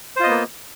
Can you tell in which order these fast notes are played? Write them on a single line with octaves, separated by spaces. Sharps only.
C5 F4 D#5 B3 A#3